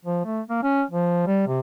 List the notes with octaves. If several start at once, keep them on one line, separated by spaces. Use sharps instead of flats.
F3
A3
A#3
C#4
F3
G3
C3